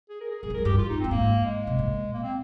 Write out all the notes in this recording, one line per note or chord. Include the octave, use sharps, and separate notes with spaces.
G#4
A#4
G#4
G#2 G#4
G2
F2 A#4
G2 G4
F4
D#4
G2 C4
G#2 A#3
G#3
C3
A#2
A#3
C4